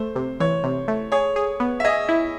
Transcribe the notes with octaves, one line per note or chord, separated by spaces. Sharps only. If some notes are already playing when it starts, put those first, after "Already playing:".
Already playing: A3 C5
C3
E3 C#5
C3
A3
G#4 C#5
G#4
B3
E5
G#4 D#5
E4